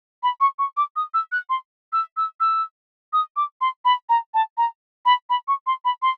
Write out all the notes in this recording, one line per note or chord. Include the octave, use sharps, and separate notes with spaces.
B5
C#6
C#6
D6
D#6
E6
F#6
C6
E6
E6
E6
D#6
D6
C6
B5
A#5
A5
A#5
B5
B5
C#6
C6
B5
C6